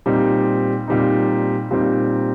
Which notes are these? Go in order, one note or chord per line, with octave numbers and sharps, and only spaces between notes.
A#2 G3 C4 D#4
A#2 G3 C4 D#4
A#2 G3 C4 D#4